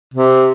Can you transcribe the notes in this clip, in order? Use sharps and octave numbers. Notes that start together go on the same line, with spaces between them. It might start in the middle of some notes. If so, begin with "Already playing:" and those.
C3